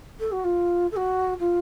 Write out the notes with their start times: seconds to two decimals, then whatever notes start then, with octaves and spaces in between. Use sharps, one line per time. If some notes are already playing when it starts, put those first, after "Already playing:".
0.20 A4
0.32 F#4
0.44 F4
0.92 A4
0.96 F#4
1.40 F4